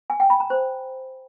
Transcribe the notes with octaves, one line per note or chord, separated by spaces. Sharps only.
G#5
G5
B5
A#5
C5